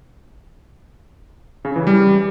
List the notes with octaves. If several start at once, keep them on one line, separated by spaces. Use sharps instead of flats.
C#3
E3
G3